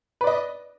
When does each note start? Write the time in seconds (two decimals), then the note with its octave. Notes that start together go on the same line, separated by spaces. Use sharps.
0.21 B4
0.24 D5
0.27 D#5